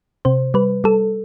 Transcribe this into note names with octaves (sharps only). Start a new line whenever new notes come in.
C3 C5
G3 B4
G3 A4